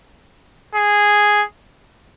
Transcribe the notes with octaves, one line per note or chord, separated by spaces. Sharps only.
G#4